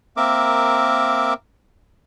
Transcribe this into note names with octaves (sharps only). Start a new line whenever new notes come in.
A#3 C4 A#4 E5 D6